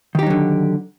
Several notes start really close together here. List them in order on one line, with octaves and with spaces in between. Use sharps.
D#3 G4 D#4 F#3 D3